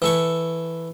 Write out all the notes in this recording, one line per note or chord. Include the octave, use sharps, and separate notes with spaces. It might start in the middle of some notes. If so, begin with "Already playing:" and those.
E3 A4 C#6